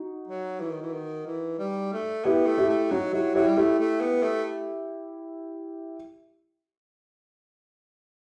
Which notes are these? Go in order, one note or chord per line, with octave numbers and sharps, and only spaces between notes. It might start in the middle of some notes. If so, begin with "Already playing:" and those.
Already playing: D#4 F#4
F#3
E3
D#3
E3
D#3
E3
G3
A3
B3 E4 G4
A3
E4 G4
A3
F#3 D#4 F#4
F#3 E4 G4
F#3 E4 G4
G3
A3 E4 G4
A3
B3
A3